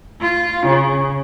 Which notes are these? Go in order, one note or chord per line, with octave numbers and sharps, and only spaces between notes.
F4
C#3